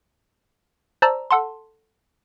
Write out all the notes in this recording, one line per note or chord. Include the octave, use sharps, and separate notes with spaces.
C5 D5 A5 A#5 E6
A4 F#5 A5 C6